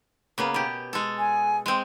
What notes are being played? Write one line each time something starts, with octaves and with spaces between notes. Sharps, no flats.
C#3 A#3 B3
B2 G4
G#3 A4
G#5
G#3 C4